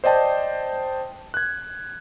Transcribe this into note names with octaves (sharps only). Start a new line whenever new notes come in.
C5 D5 D#5 G5 A5
F#6 G#6